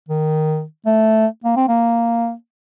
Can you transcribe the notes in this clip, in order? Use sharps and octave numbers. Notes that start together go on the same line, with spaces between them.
D#3
A3
A#3
C4
A#3